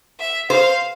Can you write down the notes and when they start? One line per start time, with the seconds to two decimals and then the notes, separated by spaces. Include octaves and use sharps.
0.19 E5
0.50 C5 F5